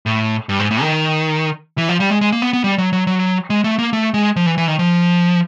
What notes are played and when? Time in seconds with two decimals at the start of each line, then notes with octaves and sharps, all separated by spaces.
0.06 A2
0.49 G2
0.60 G#2
0.71 A2
0.81 D#3
1.78 E3
1.89 F3
2.00 G3
2.10 G#3
2.21 G#3
2.32 A#3
2.42 B3
2.53 B3
2.64 G3
2.78 F#3
2.93 F#3
3.07 F#3
3.50 G#3
3.64 A3
3.79 A#3
3.93 A3
4.14 G#3
4.36 F3
4.46 E3
4.58 E3
4.68 D#3
4.79 F3